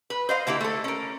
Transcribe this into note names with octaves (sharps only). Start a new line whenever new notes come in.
B4
C5 D#5 F5
D3 A#3 E4 G4
A3 A4
C#4 A#4